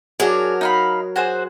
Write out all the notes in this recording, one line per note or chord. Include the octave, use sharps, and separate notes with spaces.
F#3 D4 G#4 A#4
D#4 F5 B5
F#4 G#4 C5